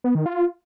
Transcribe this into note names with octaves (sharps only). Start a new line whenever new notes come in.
B3
D#3
F4